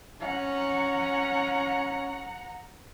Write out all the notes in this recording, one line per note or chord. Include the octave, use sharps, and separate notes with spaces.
C#4 F#5 A#5